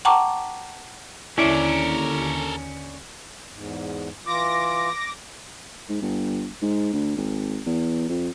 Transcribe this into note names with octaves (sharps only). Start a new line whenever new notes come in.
F#5 G5 A5 A#5 C#6 D6
D#2 D3 C#4 E4 A4 A#4 D5
E2 G#2
E3 F4 D6 A#6
G#2
G1
G#2
D2
G#1
E2
F2